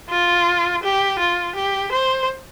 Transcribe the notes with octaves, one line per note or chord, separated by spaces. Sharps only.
F4
G4
F4
G4
C5